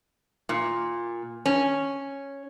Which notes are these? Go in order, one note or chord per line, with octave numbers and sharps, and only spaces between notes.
A#2
C#4